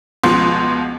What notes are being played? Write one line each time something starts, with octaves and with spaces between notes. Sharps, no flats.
C#2 B2 F3 C6